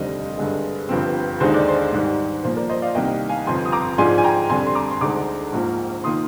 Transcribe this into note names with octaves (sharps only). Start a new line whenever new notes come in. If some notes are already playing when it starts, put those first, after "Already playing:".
Already playing: F1 D#2 D3 G3 C4 C5 D#5
G2 D3 G#3
G1 G2 F3 C4
D#2 D3 G#3 D#4 C5
D5
C5
G#2 D#3 G3
A#2 F3 A#3 C5
A#4 D5
C5 D#5
D5 F5
C2 C3 D#3 G3 A#3 D#5 G5
F5 G#5
G1 F2 C3 F3 G#5 C6
D#6
A#5 D6
G#2 F3 G#3 D4 F4 G#5 C6
G#5
G5 A#5
F2 D3 G3 G#5 C6
C6
A#5 D6
C6
D2 D3 G#3 D#4 A#5 D6
A#1 G#2 F3 A#3 F4
D#3 A#3 F4 C6 D#6